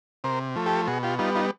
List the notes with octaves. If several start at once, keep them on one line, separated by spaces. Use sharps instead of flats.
C3 A#4 C5
F3 A3
G4 A4
B2 F#4 G#4
F4 G4
G3 B3 D#4 F4
D#4 F4